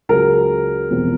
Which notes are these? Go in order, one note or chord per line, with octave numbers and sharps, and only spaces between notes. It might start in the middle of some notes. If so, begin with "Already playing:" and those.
C#2 C#3 F#3 A#4
E1 E2 C3 F3